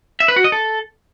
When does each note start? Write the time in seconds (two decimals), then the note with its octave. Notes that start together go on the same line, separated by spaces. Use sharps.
0.20 E5
0.28 B4
0.36 F#4
0.44 D#5
0.52 A4